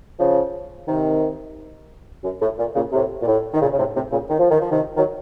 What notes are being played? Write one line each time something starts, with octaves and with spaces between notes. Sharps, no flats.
C#3 F3
C3 D#3
F#2
A2
A#2
A#2 C#3
A2 C3
A#2
A2
D#3
A#2 C#3
C#3
A2 C3
A2 C3
A#2 C#3
D#3
F3
D#3
F3
C3 D#3
D#3 F#3